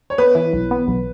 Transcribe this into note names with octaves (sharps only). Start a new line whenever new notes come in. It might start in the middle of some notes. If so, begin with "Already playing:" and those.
C#5
B3 B4
E3
B1
B3
B1